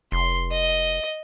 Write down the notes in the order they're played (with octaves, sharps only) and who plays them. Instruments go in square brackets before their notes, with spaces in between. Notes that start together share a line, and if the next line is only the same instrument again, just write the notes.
[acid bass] F1 [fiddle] C6
[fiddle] D#5